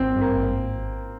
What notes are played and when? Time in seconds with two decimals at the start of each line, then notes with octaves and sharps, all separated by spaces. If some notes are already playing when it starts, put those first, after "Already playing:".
Already playing: G#1 C4
0.14 G2
0.21 A#3
0.37 G#1